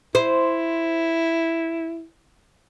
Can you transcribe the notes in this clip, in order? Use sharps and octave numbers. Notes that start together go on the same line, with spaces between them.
E4 C5